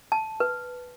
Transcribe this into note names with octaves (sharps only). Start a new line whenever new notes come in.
A5
B4